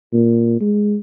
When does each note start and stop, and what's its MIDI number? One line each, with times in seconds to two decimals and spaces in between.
0.13 0.58 46
0.60 0.97 56